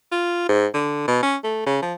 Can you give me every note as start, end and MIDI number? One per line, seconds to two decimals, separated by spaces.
0.12 0.46 65
0.49 0.67 44
0.74 1.04 50
1.08 1.20 47
1.23 1.37 61
1.44 1.66 57
1.66 1.81 49
1.82 1.94 53